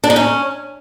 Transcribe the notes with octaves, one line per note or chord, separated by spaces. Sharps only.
D4
D#4
C#4